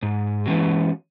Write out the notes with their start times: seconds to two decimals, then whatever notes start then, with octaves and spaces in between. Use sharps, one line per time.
0.03 G#2
0.46 E3 G#3 C#4 F#4